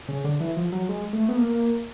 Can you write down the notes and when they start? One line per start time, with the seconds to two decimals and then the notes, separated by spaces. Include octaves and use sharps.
0.08 C#3
0.24 D3
0.40 E3
0.56 F3
0.72 F#3
0.89 G#3
1.13 A3
1.29 B3
1.36 A#3